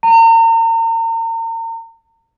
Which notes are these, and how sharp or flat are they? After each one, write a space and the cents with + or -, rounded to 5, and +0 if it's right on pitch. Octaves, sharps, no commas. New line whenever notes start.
A#5 -40